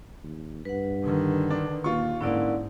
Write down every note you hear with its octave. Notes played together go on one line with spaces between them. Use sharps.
D#2
G2 B4 F#5
D3 D#3
D4
D#2 A#2 F4 C#6
G#2 D3 A#3 C#4 E4 D5